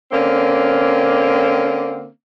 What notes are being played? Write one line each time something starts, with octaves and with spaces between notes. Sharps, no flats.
D3 A#3 C4 C#4